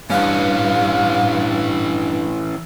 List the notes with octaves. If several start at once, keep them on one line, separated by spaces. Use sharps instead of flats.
G2 E3 C#4 F5